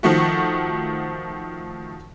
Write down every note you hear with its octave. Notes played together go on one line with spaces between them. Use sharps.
D#3 F3 A3 F#4